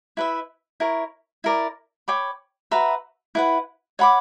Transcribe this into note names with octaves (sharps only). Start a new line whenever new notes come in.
E4 B4 E5
E4 A#4 C#5
E4 A#4 D5
C#5 G5 B5 D6
F#4 B4 E5 A#5
E4 B4 F#5
C#5 F#5 B5 D6